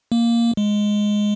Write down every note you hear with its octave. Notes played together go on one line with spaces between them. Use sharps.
A#3
G#3